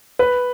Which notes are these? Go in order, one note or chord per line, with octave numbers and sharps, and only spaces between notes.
B4